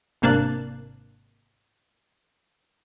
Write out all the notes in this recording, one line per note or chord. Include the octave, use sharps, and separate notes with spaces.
G#1 C3 A#3 D4 A5 F#6